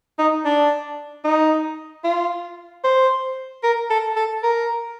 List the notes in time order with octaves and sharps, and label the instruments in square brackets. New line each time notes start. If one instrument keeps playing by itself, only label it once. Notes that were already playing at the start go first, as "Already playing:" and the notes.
[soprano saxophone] D#4
D4
D#4
F4
C5
A#4
A4
A4
A#4